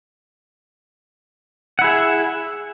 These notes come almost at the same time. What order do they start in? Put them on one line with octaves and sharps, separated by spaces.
F#5 E4 G#4 E5